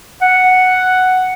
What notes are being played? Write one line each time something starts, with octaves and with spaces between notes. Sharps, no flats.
F#5